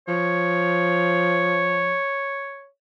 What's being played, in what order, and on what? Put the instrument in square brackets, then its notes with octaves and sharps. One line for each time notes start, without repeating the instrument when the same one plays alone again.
[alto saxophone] F3 [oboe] C#5